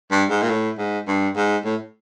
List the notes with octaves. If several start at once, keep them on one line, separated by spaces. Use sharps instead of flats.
G2
G#2
A#2
A2
G#2
G2
G#2
A2